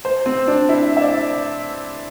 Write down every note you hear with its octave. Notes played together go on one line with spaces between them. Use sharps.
C5
C4
D4
E4
E5
D5